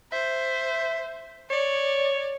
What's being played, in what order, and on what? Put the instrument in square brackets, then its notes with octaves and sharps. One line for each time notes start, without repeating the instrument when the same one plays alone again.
[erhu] C5 [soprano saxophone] E5
[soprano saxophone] C#5 [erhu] D5